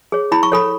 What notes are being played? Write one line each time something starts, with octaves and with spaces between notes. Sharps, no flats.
G#4 C#5
E4 B5
C#6
A4 C#5 B5